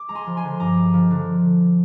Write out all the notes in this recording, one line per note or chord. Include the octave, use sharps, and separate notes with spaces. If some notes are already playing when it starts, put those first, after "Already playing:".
Already playing: D6
G#3 A#5
G#5 C6
F3
G#5 C6
D3
G2 A#5 D6
G#3
F3
D3